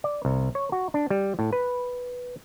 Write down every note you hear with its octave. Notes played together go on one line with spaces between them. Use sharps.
D5
C2
C#5
F#4
D4
G3
A2
B4